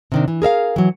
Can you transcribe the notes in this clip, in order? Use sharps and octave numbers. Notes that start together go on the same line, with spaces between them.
C3 D#3 D4
E3
G#4 A#4 E5 F5
E3 F#3